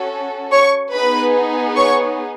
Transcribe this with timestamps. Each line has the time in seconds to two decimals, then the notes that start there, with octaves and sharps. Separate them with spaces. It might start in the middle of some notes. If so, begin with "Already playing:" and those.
Already playing: C#4 F#4 A4
0.51 C#5 C#6
0.93 B3 D#4 G#4 B4 B5
1.76 C#5 C#6